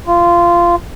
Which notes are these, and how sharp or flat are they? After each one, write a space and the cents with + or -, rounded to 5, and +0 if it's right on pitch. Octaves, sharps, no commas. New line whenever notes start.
F4 -15